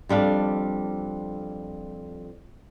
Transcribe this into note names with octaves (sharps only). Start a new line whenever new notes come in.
F2 G3 D4 F5